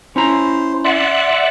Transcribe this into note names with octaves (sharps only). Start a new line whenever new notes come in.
C#4 E4 C5 A#5
D5 E5 F#5 C6